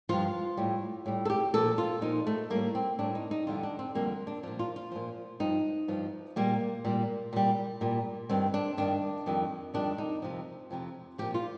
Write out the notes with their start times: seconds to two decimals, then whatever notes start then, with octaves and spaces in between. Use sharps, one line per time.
0.09 G2 F3 F4
0.57 A2 G3
1.06 A2 G3
1.25 A4
1.30 G4
1.54 A#2 F3 A4
1.78 F4
2.02 A#2 F3 D#4
2.27 A3
2.50 A2 G3 A#3
2.75 C4
2.99 A2 G3 D4
3.15 D#4
3.31 D#4
3.47 F2 D3 G3 F4
3.63 D4
3.79 C4
3.95 F2 D3 G3 A#3
4.27 D4
4.43 A#2 F3 D4
4.59 F4
4.76 F4
4.92 A#2 F3
5.40 G2 F3 D#4
5.88 G2 F3
6.36 A#2 G3 A#3
6.85 A#2 G3
7.33 A#2 G3
7.81 A#2 G3
8.29 G2 D#3 G3 C4
8.54 D4
8.78 G2 D#3 G3 D4
9.26 F2 D#3 G3
9.74 F2 D#3 G3 D4
9.98 D#4
10.22 F2 C3 F3
10.71 F2 C3 F3
11.18 A#2 F3 G4
11.34 F4